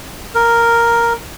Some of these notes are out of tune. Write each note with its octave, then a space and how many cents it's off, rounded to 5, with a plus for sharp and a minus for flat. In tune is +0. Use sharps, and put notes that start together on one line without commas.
A#4 +0